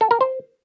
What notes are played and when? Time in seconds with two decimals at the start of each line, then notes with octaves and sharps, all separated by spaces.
0.01 A4
0.11 A#4
0.21 C5